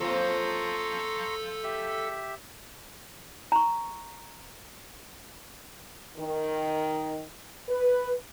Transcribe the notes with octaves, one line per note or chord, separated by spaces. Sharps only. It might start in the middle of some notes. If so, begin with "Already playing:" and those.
F3 A#3 C#4 A4 F5 A#5 C6 C#6
G4 E5
A#5 C#6
D#3
B4